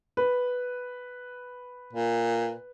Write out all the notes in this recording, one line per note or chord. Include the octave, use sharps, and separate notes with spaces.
B4
A#2